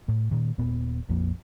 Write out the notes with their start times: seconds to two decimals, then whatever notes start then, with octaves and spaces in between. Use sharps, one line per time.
0.08 A2
0.31 A#2 D#3
0.58 D#1 A#2 B3
1.09 A#1 F2 F3 A#3